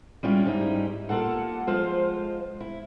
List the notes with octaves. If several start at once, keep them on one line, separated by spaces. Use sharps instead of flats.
G3 G#3 C#4 D4 E4 F4
G#2 G3 D#4 E4
A#3 F4 A4 F#5
F3 G#3 F4 C5
E4